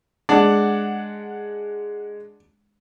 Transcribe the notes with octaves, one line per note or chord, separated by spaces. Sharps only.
G#3 D4 F#5